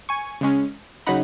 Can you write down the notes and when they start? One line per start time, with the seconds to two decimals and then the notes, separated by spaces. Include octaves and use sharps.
0.09 G#5 C#6
0.41 C#3 G#3 C#4
1.07 C#3 F#3 D#4 F#5 B5